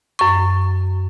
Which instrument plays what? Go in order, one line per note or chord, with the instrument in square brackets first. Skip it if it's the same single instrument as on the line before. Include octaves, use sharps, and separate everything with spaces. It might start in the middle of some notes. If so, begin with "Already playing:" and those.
[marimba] F#2 C#6